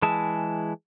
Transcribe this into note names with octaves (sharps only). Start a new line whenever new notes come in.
E3 G#3 E4 G#4 A5